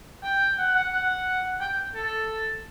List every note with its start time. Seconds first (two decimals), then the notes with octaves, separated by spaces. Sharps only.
0.23 G5
0.58 F#5
0.75 F#5
0.93 F#5
1.60 G5
1.95 A4